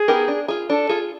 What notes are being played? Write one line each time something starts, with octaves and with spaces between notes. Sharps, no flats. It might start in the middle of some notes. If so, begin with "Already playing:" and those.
Already playing: G#4
B3 D#4 G4 A#4
D4
F4 G#4
D4 A4
F4 G#4